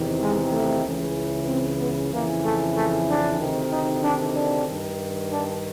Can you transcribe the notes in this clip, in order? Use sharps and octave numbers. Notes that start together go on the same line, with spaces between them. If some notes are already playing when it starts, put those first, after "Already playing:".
Already playing: E2 C3 D#3
G#3
A3
C#2 C#3 E3
C4
B3
F2 C#3 E3 A#3
A3
A3
D4
D2 C3 D#3
D#4
D4
D4
G2 D#3
D4